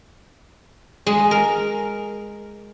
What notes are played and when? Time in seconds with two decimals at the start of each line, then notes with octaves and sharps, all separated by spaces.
1.06 G#3
1.31 A#4